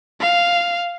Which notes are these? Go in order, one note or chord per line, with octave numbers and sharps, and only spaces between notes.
F5